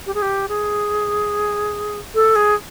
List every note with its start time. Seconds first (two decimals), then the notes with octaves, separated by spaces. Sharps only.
0.07 G4
0.14 G#4
0.22 G4
0.49 G#4
2.15 A4
2.36 G#4